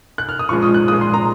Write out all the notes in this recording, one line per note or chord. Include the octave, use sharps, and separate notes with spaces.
F#6
F6
D#6
A#2 F3 G#3 C#6
D#6
F#6
A#2 F3 G#3 D#6
C6
A#5